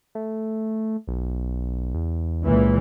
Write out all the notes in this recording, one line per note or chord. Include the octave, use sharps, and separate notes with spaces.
A3
B1
E2
C#2 A#2 E3